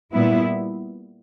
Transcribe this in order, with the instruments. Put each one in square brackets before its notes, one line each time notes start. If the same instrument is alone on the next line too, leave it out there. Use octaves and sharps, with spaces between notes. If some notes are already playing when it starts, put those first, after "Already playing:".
[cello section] A#2 G3 B3 E4